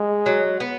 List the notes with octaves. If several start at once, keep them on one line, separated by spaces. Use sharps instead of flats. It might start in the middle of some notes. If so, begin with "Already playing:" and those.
Already playing: G#3
F#3
B3